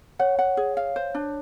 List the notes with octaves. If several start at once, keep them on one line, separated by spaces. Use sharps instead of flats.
C#5 F#5
F#5
G#4
F5
C5
D4